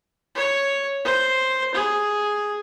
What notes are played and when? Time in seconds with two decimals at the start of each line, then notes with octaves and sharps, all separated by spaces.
0.35 C#5
1.04 C5
1.74 G#4